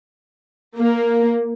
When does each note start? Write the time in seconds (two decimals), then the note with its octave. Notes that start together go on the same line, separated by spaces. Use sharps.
0.78 A#3